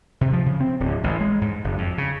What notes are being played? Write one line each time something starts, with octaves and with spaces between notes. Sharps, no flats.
C3
F3
C#3
C4
D1
A1
G#3
G#2
F#1
F2
C#3